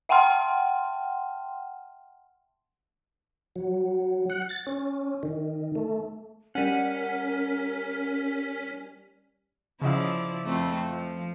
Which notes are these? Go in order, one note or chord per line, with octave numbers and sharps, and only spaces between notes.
E5 F#5 G5 A5 C6 F6
F#3
F#5
A6
C#4
D#3
A3
G3 C#4 A#4 F#5 B6 D#7
C#3 F3 E4 D5 D#5 F5
F2 A3 C4
F3